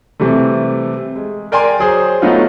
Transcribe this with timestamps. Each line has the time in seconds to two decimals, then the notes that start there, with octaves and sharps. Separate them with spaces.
0.20 C3 E3 G3 A3
1.16 G#3
1.52 A#4 D5 G5 G#5 A#5 C6
1.79 F#3 G#4 C5
2.22 F#3 A3 B3 D#4 F4 F#4